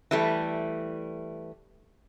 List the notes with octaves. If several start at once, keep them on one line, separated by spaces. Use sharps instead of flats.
E3 G3 A3